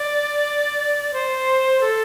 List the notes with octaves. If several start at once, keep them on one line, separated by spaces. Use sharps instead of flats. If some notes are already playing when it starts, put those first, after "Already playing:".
Already playing: D5
C5
A4